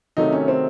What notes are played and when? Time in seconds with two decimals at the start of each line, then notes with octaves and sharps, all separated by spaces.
0.17 C3 D#3 F#3 A3 D#4
0.33 C#4
0.48 C4